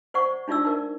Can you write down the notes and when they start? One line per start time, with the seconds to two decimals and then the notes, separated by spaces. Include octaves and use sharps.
0.14 C5 D5 F#5 C#6
0.48 D4 D#4 F4 D5 E6
0.65 D#4 A#4 D5